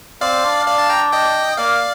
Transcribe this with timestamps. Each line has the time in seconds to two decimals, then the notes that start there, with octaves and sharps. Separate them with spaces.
0.21 C4 D5 F5
0.44 D4
0.67 D5 F5
0.78 F5 A5
0.90 G5 A#5
1.12 D#5 G5
1.57 A#3 D5 F5